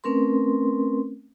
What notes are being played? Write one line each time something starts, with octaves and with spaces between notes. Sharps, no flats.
A3 C4 C#4 A#4 B4 C6